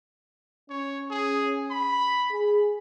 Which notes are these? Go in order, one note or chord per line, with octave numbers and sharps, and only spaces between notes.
C#4 C#5
G#4
B5
G#4